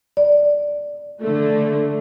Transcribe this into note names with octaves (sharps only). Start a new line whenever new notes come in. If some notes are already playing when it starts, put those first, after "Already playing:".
D5
D3 A3